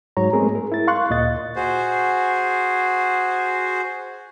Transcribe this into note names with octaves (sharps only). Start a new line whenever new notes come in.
G#2 F#3 C#5 A#5
G#3 A3 B3 C4 G#4 A#4
A#4
E4 A6
F5 C6 C#6 F#6
D2 A#2 D#5 A6
F#4 G#4 C5